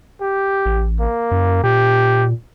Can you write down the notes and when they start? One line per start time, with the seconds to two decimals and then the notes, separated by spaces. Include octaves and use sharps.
0.21 G4
0.66 A1
1.00 A#3
1.31 F#2
1.64 A#2 G4